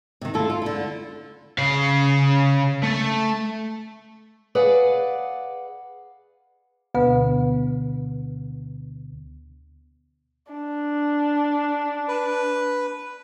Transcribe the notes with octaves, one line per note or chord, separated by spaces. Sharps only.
C3 D#3
A3 E4 F4 A4
F4
D3 E4
C#3 F5
A3
G#4 B4 D5 F5 F#5
D2 B2 D3 B3 B4
D4
B4